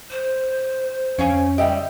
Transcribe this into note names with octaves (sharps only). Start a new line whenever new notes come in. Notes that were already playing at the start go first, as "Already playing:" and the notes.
C5
F2 C#4 F5 G#5
C#2 G3 G4 D#5 E5 G5